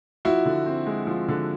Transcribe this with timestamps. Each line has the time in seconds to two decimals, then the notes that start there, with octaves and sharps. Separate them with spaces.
0.25 F3 E4 F#4
0.46 D3
0.66 C4
0.86 G#3
1.07 F3
1.28 D3